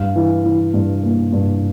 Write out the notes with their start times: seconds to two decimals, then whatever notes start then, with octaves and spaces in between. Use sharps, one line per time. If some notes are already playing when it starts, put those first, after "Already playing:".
Already playing: G2 F5
0.16 E3
0.44 E3
0.74 G2
1.03 A#3
1.33 G2